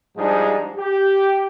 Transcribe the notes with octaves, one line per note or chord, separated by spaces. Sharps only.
G#2 F3 G3 D4 D#4 G#4
G4